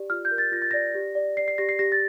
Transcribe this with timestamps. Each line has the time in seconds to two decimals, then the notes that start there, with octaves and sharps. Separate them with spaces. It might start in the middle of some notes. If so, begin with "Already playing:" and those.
Already playing: G4 D5
0.10 F4 F6
0.25 G6
0.31 A#4
0.38 A6
0.52 F4 A#6
0.62 A6
0.71 D5 A#6
0.95 G4
1.15 D5
1.37 D5 C7
1.48 C7
1.58 G4 A#6
1.69 C7
1.79 G4 A#6
1.92 A6